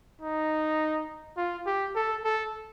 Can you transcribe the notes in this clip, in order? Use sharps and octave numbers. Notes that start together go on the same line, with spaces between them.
D#4
F4
G4
A4
A4